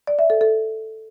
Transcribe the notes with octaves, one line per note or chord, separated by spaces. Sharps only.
D5
E5
A4
A4